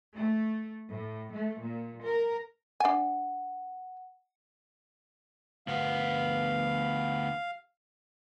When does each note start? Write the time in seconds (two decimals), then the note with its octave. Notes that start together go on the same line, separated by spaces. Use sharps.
0.13 A3
0.88 A2
1.29 A3
1.60 A#2
2.02 A#4
2.80 D4 F#5 G#5
5.67 D2 B3 F5